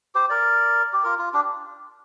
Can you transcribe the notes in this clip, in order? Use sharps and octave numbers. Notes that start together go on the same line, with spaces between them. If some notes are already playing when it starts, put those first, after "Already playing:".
G4 C5
A#4 D5
G4
F4 A#4
F4
D4 G4